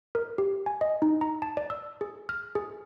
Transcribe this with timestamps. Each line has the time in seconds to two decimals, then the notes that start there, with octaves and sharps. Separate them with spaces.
0.15 A#4
0.38 G4
0.66 G#5
0.81 D#5
1.02 D#4
1.21 A#5
1.42 A5
1.57 D5
1.70 E6
2.01 G#4
2.29 F6
2.55 G#4